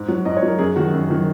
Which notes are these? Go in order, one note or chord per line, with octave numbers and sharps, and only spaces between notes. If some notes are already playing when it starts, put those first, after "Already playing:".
Already playing: G#2
F#3
G#2 D#5
C#5
F#3
A#4
F#2 G#4
D#3 F#3 F#4
F#2
D#3 F#3